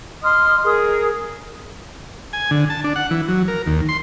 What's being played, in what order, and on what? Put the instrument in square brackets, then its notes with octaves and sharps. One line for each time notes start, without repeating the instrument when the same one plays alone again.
[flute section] D#5 C6 D#6 F6
G#4 A#4 D#6
[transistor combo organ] G#5
D3
A5
D4
F#5
E3
F#3
A#4
D#2
C6